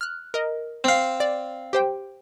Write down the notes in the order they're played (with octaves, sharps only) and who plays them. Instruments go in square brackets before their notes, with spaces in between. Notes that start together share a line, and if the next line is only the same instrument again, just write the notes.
[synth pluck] F6 F#6
A#4 D#5
[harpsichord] C4 F5
[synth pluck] D5
G4 C5 G5